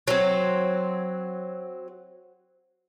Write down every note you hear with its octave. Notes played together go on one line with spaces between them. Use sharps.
F#3 C4